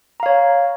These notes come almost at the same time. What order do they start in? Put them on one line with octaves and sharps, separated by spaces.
A#5 F5 C#5